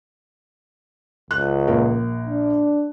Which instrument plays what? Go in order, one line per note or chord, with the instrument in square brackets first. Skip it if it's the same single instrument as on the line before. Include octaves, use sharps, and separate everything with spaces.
[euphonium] C#2 [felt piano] F#6
[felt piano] A#1 A#4
[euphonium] D4